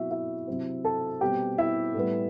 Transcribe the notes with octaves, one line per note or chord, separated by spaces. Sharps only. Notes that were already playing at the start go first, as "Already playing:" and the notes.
Already playing: B2 F#3 C4 E4 F#4 E5
E4 E5
C3 F#3 C4
A4 A5
B2 G3 C4 G4 G5
E4 E5
A2 G3 B3